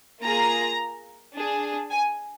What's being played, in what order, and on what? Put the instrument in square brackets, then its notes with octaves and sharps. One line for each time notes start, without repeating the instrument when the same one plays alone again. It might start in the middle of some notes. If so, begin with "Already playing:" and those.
[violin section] A#3 F4 G#4 A#5
D4 G#4
G#5